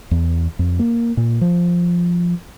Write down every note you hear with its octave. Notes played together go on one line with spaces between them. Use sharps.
E2
F2
A#3
A#2
F3